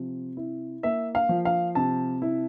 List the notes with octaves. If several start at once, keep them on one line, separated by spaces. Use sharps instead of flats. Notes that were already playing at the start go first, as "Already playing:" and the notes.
Already playing: C3 F3
E4
A#3 E5
F5
F3
F5
C3 A5
E4